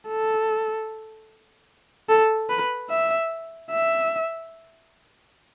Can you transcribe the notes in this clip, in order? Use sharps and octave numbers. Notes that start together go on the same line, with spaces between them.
A4
A4
B4
E5
E5